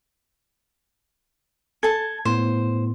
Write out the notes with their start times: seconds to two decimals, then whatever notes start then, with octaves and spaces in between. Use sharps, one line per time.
1.83 A4 A5 G#6
2.25 A2 B3 C5